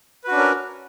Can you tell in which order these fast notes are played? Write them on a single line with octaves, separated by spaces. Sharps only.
B4 F#4 D4 C#4 A#4